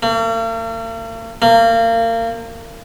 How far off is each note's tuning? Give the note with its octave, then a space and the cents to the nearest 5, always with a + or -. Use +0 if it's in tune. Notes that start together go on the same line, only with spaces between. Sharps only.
A#3 -45
A#3 -30